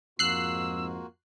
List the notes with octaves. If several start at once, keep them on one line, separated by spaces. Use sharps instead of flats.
F2 G#2 A#3 F4 F#4 E6 F#6 C7